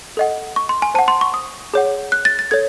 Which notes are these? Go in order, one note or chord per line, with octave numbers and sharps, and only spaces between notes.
A4 D#5 F#5
C#6
C6
G#5
C5 F#5 A5
C6
C#6
D#6
G#4 C#5 F#5
F#6
A6
A6
A4 C#5 G#6